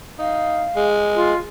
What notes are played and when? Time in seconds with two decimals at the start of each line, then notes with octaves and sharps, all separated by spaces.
0.19 D#4 F5
0.76 G#3
1.15 F4